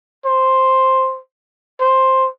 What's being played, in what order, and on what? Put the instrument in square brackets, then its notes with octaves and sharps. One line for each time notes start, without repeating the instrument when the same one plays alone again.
[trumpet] C5
C5